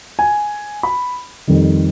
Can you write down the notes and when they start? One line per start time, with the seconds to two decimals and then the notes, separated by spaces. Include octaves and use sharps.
0.19 G#5
0.83 B5
1.48 F2 D#3 G3